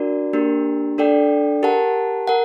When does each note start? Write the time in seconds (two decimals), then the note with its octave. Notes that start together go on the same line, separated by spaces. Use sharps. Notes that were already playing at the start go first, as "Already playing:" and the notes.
Already playing: D4 F#4 A#4 D5
0.33 A#3 D4 G4 A#4
0.98 D4 A4 D5 G5
1.63 G4 A#4 F#5 A5
2.27 A#4 F#5